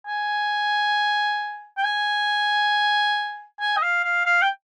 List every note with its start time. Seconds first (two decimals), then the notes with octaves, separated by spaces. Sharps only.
0.07 G#5
1.77 G5
1.84 G#5
3.60 G#5
3.77 D#5
3.83 F5
4.05 F5
4.26 F5
4.42 G5